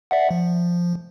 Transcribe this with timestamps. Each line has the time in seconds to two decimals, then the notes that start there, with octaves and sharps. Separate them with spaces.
0.11 D5 E5 F#5
0.31 F3